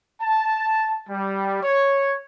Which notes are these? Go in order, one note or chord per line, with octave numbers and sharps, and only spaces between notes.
A5
G3
C#5